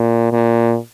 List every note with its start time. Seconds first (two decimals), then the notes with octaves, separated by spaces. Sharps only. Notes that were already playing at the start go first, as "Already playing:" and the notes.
Already playing: A#2
0.32 A#2